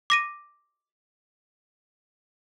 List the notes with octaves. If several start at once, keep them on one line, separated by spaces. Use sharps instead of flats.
D6 A#6 D#7